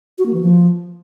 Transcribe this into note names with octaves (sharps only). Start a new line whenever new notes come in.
F#4
A#3
E3
F3